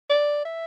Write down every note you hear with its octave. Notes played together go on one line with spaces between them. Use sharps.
D5
E5